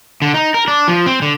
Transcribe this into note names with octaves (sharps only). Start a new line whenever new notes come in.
D3
D#4
A#4
D4
F3
C4
D3